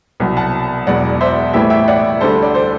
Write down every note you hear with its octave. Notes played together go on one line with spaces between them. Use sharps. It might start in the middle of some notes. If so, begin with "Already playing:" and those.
C2 B2 F#3
F#5 A5
E1 E2 B2 F#3 D5 F#5
C5 E5
A1 A2 E3 G3 E5 G5
E5 G5
D5 F#5
D2 D3 G3 A4 C5
D5
A4 C5